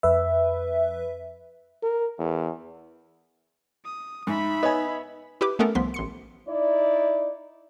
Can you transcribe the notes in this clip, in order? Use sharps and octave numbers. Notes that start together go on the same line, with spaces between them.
F2 B4 E5
A#4
E2
D#6
G#2 D#4 E5 B5
B3 C#5 D#5 G#5
E4 G4 B4 D6
A3 B3 C#4 A4 A#4
C2 F3 B3 C6 B6
A1 C6 C#7
D#4 E4 D5